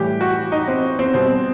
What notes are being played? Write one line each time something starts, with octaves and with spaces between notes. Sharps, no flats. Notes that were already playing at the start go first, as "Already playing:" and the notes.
Already playing: A2 E3 G3 G4
F#4
D#4
C4
C4
B2 G3 C4